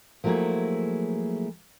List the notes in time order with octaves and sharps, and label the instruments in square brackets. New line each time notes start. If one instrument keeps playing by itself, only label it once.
[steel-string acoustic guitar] F3 F#3 A3 A#3 E4 G#4